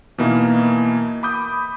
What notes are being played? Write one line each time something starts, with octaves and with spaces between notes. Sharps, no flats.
B2 E3 A#3 D#4 E4
B5 D6 D#6 G6